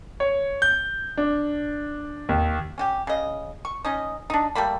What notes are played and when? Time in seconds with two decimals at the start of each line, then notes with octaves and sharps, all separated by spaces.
0.20 C#5
0.62 G6
1.17 D4
2.29 D#2
2.78 C#4 F#4 G4
3.07 C#3 D#5
3.65 C#6
3.85 C#4 D#4 D#5
4.30 D4 D#4
4.55 G3 A3 A#3 B5